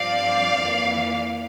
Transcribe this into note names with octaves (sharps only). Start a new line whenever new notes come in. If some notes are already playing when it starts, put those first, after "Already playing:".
Already playing: G2 F3 C4 D5 F5
F2 E3 A#3